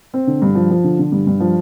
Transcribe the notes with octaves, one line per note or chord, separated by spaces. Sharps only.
C4
D3
G2
F3
F3
D3
D3
G2
G2
F3